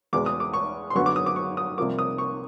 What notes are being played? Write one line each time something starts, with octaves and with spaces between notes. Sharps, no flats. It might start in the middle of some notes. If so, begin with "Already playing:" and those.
E2 B2 G#3 B3 D6
D#6
D6
C#6
C6
F#2 D3 F#3 B3 C#6
D6
D#6
D6
C#6
D#6
C2 C3 F3 A#3 D6
D#6
C#6